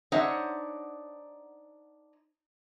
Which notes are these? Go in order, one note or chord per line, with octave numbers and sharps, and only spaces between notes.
D4 D#4 C5 C#5 E5 F#5